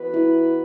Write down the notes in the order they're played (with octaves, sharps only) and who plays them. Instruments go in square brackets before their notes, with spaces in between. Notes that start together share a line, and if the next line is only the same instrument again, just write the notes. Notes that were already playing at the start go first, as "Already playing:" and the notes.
Already playing: [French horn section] E3 B3 F#4 B4
[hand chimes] E4